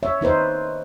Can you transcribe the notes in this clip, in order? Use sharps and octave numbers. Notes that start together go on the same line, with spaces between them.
C#5 E5
D#3 D#4 B4 C5